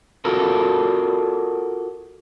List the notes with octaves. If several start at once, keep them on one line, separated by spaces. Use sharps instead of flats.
F4 F#4 A4 A#4